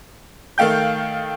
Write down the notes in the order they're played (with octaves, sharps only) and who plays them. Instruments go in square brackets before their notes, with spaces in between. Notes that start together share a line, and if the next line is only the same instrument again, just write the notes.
[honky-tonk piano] D#3 A3 F5 G5 G6